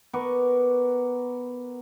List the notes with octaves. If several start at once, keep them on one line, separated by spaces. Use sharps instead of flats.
B3 A#4 C#6 D6